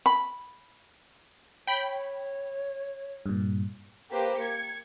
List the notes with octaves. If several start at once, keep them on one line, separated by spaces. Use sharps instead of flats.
B5
C#5 G5 B5
G2 A#2
A#3 G4 B4 C5
G#6 C#7